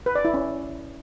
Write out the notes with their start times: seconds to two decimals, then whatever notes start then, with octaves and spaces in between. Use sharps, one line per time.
0.06 B4
0.15 D5
0.25 E4
0.34 C#4